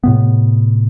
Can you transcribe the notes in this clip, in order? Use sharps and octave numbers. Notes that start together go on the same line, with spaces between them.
A2 C3 B3